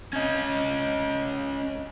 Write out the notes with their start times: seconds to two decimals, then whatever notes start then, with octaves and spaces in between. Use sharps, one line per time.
0.13 C#4 D#5